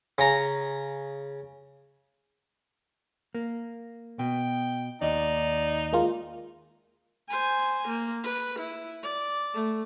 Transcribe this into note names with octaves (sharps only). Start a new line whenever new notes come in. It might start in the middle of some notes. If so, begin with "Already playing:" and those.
C#3 A#5
A#3
B2 G5
D#2 D#4 D5 D#5
G#3 A#3 F4
C5 G#5
A#3
B4
E4
D5
A3